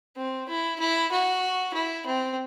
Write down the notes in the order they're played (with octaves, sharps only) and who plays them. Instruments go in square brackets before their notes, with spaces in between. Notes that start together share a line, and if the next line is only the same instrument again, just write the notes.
[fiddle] C4
E4
E4
F#4
E4
C4